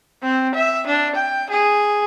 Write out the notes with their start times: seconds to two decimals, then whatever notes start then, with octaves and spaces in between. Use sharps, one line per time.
0.23 C4
0.55 E5
0.87 D4
1.15 G5
1.50 G#4